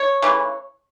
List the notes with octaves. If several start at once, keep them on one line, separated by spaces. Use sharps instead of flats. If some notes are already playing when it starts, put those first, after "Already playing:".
Already playing: C#5
C#3 E3 A3